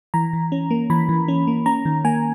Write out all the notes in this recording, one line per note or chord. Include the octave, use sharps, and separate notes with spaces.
E3 A#5
E3
C#4
A#3
E3 B5
E3
C#4
A#3
C#4 A#5
D#3
A#3 G#5